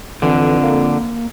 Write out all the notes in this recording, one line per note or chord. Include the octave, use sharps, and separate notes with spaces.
F2 D3 E3
A#3